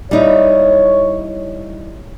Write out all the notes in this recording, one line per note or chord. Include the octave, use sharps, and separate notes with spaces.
G3 D#4 E4 C#5